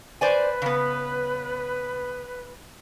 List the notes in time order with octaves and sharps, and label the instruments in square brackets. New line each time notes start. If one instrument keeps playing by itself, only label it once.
[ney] B4 [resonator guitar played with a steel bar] C5 D5 G#5
[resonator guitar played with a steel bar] C#3 B3